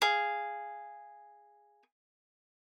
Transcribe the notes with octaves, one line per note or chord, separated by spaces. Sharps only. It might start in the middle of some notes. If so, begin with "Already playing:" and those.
G#4 F5